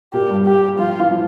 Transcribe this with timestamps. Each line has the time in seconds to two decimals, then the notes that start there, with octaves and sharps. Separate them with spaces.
0.13 A#2 A#3 G4
0.29 G2 G3
0.46 G4
0.79 F3 F4
0.99 E3
1.11 F3